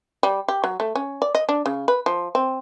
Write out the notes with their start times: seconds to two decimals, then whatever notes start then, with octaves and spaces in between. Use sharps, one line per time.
0.23 G3
0.48 G4
0.64 F#3
0.80 A3
0.95 C#4
1.22 D5
1.35 D#5
1.49 D4
1.66 C#3
1.88 B4
2.06 F3
2.35 C4